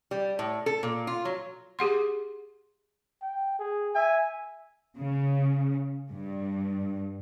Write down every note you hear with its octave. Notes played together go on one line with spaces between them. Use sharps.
G3
A2
A4
A#2
F4
F#3
G4 G#4 F#5 C6
G5
G#4
E5 G#5
C#3
G2